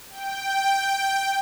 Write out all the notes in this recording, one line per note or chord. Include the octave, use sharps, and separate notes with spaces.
G5